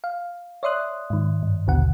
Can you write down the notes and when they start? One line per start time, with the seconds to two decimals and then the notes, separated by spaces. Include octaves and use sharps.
0.04 F5
0.63 C#5 D5 E5 C6 D#6 F#6
1.10 G#2 D#3
1.43 G2
1.67 A#1 D#2 B2 D3 F#5